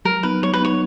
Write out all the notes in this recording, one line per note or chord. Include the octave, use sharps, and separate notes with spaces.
F#3 A#4
B3 D#4 B4
F#3 C#5
B4
B3 D#4 C#5